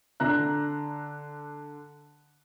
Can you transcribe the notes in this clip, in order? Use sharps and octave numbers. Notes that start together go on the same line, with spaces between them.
D3 A#5 F#6